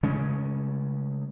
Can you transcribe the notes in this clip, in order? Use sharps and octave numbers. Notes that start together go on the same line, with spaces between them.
C#3 G#3 A3 C#4